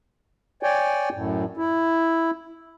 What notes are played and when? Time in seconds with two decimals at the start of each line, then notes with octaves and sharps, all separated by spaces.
0.63 C#5 D5 G5 G#5
1.14 F#2 A2
1.57 E4